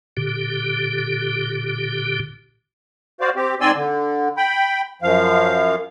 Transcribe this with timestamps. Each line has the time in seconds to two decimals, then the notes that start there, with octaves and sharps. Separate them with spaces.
0.17 A#2 D3 G4
3.21 F#4 C5 D5 F5
3.36 C4 G4
3.61 G#2 C4 D5 G#5 C6 E6
3.76 D3
4.37 G5 B5
5.02 F#2 F3 F5